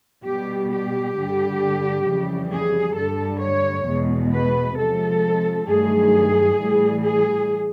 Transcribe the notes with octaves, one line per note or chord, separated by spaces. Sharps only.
B2 G3 G4
G4
G2 D3 G3
F2 C#3 E3 G3
G#4
G2 D3 G3 A4
C#5
E2 B2 G#3
B4
C3 F3 G#3 A4
G2 D#3 F#3 A3 G#4
A2 E3 G3
G#4